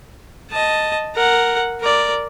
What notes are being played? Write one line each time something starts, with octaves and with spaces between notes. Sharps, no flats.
D#5 A5
A#4 F#5
A#4 D5